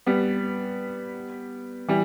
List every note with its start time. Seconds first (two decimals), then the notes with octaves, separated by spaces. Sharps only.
0.06 G3 B3
1.88 E3 G3